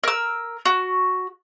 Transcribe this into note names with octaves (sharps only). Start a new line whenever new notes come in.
A#4 E6
F#4